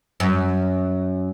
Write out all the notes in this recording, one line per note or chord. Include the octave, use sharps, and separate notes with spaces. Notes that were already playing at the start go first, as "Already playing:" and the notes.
F#2